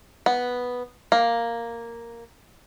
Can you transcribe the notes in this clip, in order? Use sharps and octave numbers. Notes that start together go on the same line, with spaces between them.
B3
A#3